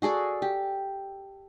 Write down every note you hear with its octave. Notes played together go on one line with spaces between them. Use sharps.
F#4 G#4 A4 D5
G4